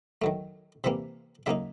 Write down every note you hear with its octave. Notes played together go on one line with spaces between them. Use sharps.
D#3 F#3 A3
C3 E3 G3 A#3 E5
C#3 F#3 A#3 D#4 E5